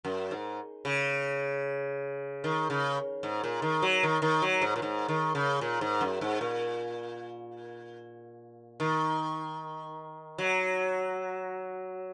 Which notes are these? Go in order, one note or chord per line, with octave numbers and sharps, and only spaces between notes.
F#2
G#2
C#3
D#3
C#3
G#2
A#2
D#3
F#3
D#3
D#3
F#3
G#2
A#2
G#2
D#3
C#3
A#2
G#2
F#2
G#2
A#2
D#3
F#3